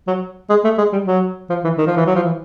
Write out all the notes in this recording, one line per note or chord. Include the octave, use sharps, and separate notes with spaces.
F#3
G#3
A3
G#3
G3
F#3
F3
E3
D#3
F3
E3
F#3
F3
E3